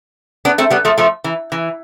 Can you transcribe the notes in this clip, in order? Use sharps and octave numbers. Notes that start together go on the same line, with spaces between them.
B3 D4
A3 C4
G3 B3
F3 A3
F3 A3
E3
E3